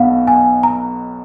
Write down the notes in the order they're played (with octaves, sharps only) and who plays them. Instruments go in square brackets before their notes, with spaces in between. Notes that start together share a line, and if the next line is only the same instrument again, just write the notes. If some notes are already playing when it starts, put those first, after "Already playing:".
Already playing: [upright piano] B1 B2 [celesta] F5 F#5
[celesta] G#5
A#5